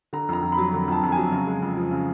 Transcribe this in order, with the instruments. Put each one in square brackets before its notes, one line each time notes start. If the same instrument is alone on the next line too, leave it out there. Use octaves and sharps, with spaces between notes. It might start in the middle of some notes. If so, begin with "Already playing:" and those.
[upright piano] D3 A#5
F2 A#5
F2
B5
F#3
D3
F2 A5
F2
G#5
F#3
C#3
G#3
F2
F3
C#3